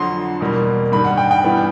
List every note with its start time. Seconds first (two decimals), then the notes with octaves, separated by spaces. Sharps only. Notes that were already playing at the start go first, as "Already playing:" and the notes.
Already playing: F2 D3 F#3 C6
0.41 E2 B2 G3 A#3
0.92 G2 D#3 G3 B5
1.05 F#5
1.17 G5
1.31 G5
1.44 G2 E3 G3 B3